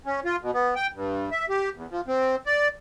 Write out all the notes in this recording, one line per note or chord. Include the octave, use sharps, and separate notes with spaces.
C#4
F4
B2
B3
G5
G2
E5
G4
E2
F3
C4
D5